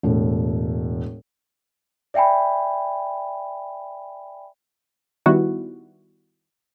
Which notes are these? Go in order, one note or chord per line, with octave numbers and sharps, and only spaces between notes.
E1 A2
D5 E5 G5 G#5 B5
D#3 G3 B3 E4 F#4